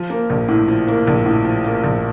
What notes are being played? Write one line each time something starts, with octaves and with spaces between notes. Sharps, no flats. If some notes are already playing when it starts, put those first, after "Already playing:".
Already playing: F3
A#3
A#1
A2
F3
A#3
A#1
A2
F3
A#3
A#1